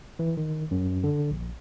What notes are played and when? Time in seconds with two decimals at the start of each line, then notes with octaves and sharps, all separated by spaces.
0.19 E3
0.37 D#3
0.71 F#2
1.04 D3
1.31 A#1